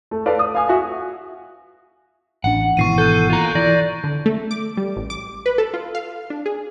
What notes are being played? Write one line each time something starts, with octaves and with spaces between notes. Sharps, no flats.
A3
A4 B4 D5 F5
D#6
F5 G#5 D#6
F#4 E5 G#5
A1 D4 F#5
G#1 B2 E3 C#6 C7 D#7
A4 F#6 G6
F4 A#5
E3 D5 A#6
D3
A3
D6
G3
A1
D6
B4
A4
F4
F5
D4
G#4